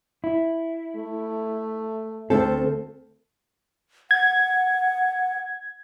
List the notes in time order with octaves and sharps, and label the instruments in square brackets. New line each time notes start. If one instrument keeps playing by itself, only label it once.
[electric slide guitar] E4
[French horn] A3
[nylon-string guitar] D2 A4 [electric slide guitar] C4
[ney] F#5 [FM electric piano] G#6